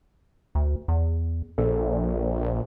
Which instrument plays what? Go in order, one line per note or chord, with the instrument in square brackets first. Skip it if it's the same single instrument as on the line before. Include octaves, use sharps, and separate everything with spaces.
[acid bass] D2
E2
[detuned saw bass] A#1 [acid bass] A4